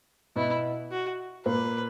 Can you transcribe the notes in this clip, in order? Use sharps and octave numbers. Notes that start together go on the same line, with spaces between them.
B2 B3 E4
F#4
A#2 A#3 B4